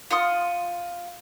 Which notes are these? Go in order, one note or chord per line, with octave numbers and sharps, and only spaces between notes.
F4 F#5 C6 D#6